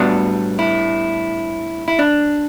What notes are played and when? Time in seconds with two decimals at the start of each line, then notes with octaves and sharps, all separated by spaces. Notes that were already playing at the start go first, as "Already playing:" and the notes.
Already playing: A2 G3 B3 D4 F#4
0.59 E4
1.88 E4
1.99 D4